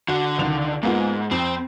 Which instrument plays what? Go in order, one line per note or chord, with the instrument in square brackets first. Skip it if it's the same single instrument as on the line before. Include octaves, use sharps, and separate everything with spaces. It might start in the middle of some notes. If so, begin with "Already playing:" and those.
[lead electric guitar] D3 [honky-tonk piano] F#4
[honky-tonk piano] C#2 D#3 F7
[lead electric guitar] G#2 [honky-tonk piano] A#3 B3 F4
[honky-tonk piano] F2 [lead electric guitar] C4